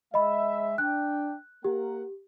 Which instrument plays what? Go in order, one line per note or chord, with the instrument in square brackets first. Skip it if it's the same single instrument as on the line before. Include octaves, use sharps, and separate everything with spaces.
[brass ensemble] G#3 E5 [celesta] D#5 B5
[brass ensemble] D4 G5 [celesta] F#6
[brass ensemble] A#3 A#4 F#5 [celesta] G4